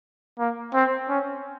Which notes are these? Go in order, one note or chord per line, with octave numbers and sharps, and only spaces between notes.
A#3
C4
C#4